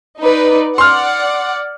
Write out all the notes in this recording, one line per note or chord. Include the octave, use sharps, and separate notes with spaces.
D#4 B4 D5
D5 F#5 C6 F6